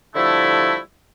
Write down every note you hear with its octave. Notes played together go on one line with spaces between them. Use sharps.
D3 F3 G3 A3 E4